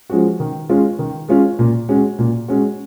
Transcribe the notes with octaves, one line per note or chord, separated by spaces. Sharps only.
F3 G#3 C#4 F#4
D#3
G#3 C#4 F4
D#3
G#3 C#4 F4
A#2
G#3 C#4 F#4
A#2
G#3 C#4 F#4